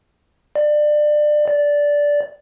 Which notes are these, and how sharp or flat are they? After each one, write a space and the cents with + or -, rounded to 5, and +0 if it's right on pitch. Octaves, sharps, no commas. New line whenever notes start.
D5 +25
D5 -10